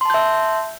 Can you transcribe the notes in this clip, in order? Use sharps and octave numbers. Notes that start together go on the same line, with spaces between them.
E5 A5 C6 G6